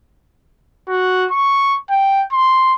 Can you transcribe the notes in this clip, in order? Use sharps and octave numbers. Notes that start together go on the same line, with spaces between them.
F#4
C#6
G5
C6